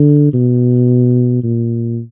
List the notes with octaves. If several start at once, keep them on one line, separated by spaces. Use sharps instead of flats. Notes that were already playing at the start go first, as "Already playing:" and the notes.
Already playing: D3
B2
A#2